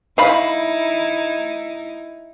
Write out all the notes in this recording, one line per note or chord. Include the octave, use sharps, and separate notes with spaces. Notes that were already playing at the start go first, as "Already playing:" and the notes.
D#4 E4 F5 B5